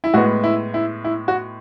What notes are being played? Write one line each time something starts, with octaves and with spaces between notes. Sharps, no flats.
E4
A2 G#3 B3 F#4
E4
E4
E4
F#4